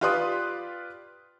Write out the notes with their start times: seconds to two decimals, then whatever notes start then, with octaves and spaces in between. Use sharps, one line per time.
0.01 F4 G4 B4 D5 C6 D#6